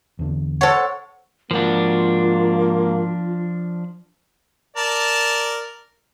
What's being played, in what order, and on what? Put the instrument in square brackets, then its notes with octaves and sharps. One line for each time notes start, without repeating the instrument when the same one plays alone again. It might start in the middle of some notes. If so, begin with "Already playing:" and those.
[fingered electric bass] E2 D3
[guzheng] A4 C#5 [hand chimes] C5 F#5
[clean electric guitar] G#2 F#4 [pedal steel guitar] F3 D4 [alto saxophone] A#3 [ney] F4
[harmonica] A#4 D5 A5